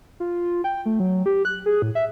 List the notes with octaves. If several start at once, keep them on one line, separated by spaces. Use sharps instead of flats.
F4
G5
A3
F#3
G4
F#6
G#4
A2
E5